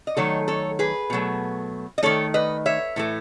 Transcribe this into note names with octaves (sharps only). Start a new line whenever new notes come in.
D#5
D#3 F#3 A3 A4 C#5
A4 C#5
G#4 B4
B2 F#3 A3
D#5
D#3 A3 A4 C#5
B4 D#5
C#5 E5
A2 E3 A3